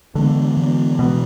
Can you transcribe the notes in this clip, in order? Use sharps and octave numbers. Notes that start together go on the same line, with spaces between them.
D3 E3 G#3 B3
E3 G#3 B3
B2 E3 G#3 B3